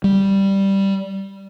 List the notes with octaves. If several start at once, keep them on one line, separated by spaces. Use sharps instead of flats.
G3